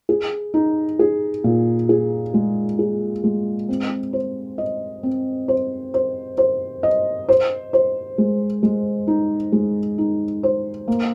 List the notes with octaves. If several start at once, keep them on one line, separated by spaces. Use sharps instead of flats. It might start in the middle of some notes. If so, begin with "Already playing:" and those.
G#4
D#4
G#4
A#2
G#4
G#3
G#4
G#3
C4
C5
D#5
C4
C5
C5
C5
D#5
C5
C5
G#3
G#3
D#4
G#3
D#4
C5
A#3